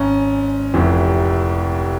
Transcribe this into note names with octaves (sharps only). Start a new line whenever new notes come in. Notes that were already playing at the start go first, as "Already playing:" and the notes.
Already playing: G#1 C#4
F1 F2 C3 E3